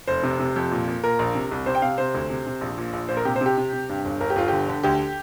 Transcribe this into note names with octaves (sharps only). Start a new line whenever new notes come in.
F1 C5
C3
C3
F2
A#2
A#2
A#2 A#4
A#1
C3
C2
C3 C5
G5
C3 F5
C3 C5
D2
C3
C3
A#1
A#2
A#1
A#2 C5
A#4
C3 G4
C5
C3 G4
C3
C3
G2
G1
G1 A#4
G4
G1 F4
D3 G4
D3
D2 G4